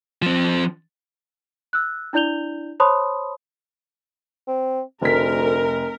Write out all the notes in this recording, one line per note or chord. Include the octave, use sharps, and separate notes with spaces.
F3 C4
E6 F#6
D4 E4 D5 G6 F7 G7
C5 C#5 A5 B5 C6 D#6
C4
F1 D2 A#4 B6